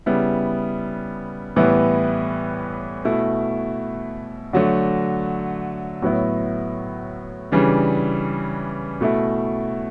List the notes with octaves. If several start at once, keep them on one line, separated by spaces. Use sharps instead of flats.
C#3 G3 B3 E4
A2 E3 G3 B3 E4
B2 A3 E4
D3 F#3 A3
A2 F#3 B3 E4
C#3 E3 G3 D4
B2 A3 E4